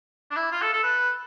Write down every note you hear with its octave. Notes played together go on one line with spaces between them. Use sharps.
D4
E4
F4
A4
A4
B4